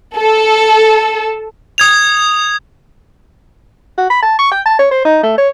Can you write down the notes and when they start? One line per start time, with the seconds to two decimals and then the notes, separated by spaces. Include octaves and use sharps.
0.15 A4
1.78 D#6 G#6 F7
3.98 F#4
4.10 B5
4.23 A5
4.39 C#6
4.52 G5
4.66 A5
4.79 C#5
4.91 C5
5.05 D#4
5.23 A3
5.38 C#5